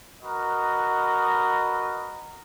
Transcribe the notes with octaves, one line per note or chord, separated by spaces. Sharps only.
F#4 A#4 B4 D#5